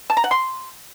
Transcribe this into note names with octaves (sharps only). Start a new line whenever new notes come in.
A5
A#5
F#5
C6